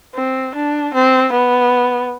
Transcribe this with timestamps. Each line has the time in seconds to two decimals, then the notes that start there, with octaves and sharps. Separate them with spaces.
0.15 C4
0.55 D4
0.94 C4
1.33 B3